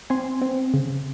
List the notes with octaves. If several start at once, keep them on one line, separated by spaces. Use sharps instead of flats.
C4 G#5 C6
C4
C#3